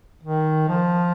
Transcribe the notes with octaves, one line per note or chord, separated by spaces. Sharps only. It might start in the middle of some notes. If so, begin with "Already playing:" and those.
D#3
F3